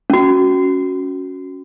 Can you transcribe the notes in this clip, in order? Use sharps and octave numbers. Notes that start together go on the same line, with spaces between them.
C#4 F#4